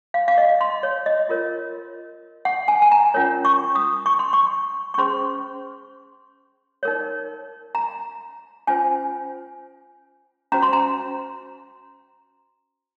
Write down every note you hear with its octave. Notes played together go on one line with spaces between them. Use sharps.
F5
F5
D#5
C6
C#5
D#5
F4 A#4 C#5
F#5
G#5
G#5
A#5
C#4 F4 A#4 C#5
C#6
D#6
C#6
C6
C#6
C#6
C#4 G#4 C5 C6
D#4 A#4 C#5
A#5
C#4 F4 C5 G#5
C#4 F#4 C5 A#5
C6
A#5